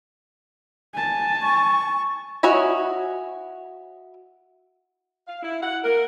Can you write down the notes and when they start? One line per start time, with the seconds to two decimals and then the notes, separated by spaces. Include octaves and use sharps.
0.94 G#5 A5
1.42 C#6
2.43 E4 F#4 C#5 D#5 G#5
5.28 F5
5.42 E4
5.62 F#5
5.84 A#4